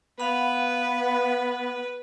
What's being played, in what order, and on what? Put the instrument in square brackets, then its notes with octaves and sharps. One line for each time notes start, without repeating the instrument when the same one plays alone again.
[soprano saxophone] B3 [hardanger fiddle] B4 [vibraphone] F5 F#5 B5